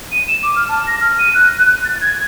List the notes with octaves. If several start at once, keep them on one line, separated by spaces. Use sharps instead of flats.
D#7
E7
D6
F6
A5
A#6
F6
D#7
F#6
F#6
A6
G#6